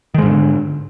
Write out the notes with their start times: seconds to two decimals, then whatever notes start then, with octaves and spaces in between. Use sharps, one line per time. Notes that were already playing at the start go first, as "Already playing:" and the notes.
0.14 D#3
0.18 G#3
0.22 G#2
0.26 D3